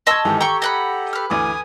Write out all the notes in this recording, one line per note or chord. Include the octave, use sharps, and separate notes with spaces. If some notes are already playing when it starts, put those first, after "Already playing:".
D#5 A5 C6 C#6 E6 G#6
G#2 D#3 E3 G4 A4
G5 A#5 C#6
D#5 F#5 B5
B4 F6
D2 E3 G#5 D6 D#6